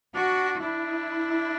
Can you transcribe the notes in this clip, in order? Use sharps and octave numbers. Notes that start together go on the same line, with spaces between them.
D4 F#4
D4 E4